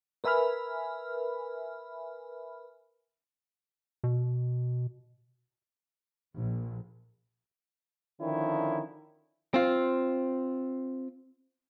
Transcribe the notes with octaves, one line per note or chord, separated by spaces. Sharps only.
A#4 B4 E5 G#5 B5 F6
B2
A#1
D3 D#3 F3 C#4 E4
C4 F4